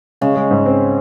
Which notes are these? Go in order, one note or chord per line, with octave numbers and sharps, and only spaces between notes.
C#3 G#3
G#3
G#2
C4